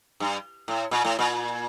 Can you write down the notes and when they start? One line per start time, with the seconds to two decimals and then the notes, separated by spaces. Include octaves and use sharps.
0.20 G2
0.68 A2
0.91 A#2
1.05 A2
1.19 A#2